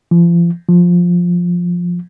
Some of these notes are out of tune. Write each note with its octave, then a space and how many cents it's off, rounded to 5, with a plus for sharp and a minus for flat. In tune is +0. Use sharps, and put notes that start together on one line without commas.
F3 -40
F3 +5